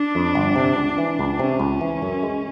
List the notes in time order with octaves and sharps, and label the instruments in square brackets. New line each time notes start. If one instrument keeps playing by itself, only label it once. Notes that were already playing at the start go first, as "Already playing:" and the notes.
Already playing: [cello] D4
[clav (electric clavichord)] F2
G1
C3
C#2
E3
C#2
[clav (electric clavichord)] C3 [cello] C#4
[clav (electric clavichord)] C#2
E3
F#2
G#3